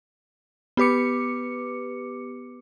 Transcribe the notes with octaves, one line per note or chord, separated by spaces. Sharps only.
B3 G4 B4 D6 C#7